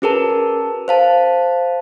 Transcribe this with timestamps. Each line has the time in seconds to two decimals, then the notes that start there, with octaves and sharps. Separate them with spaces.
0.02 C#4 F#4 G#4 A#4 B4 A5
0.88 C5 F5 A5